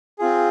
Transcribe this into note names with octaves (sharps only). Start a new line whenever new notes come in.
C4 F4 G#4